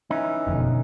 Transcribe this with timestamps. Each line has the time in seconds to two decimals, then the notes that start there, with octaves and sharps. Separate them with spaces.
0.11 E3 C#4 D#4
0.47 F#1 F2 B2 D3